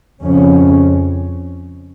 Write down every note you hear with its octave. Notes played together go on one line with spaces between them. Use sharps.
F2 C#3 C#4